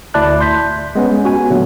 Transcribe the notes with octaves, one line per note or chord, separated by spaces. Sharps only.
D2 E4 D5 A5 F#6
C6 G6 B6
G#3 B3 C#4
F#4 G#5
A#2 D3 F#3 A3 B3